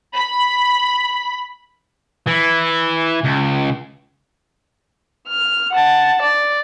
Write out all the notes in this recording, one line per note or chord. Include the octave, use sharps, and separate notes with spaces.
B5
E3
C#2
F6
F#5 A5
D5